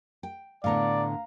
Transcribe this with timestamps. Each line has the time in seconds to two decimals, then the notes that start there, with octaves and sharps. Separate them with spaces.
0.23 G5
0.64 A2 D3 B3 D5 F5 A#5